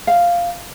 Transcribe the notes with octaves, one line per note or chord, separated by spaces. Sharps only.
F5